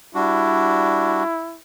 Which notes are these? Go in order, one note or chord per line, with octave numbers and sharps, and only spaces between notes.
G3 D4 E4 F#4